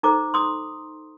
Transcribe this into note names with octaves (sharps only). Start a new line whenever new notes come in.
D#4 A4 C5 A#5 D6
C6 D#6